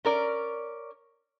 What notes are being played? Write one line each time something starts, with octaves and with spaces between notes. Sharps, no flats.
C#4 A#4 D5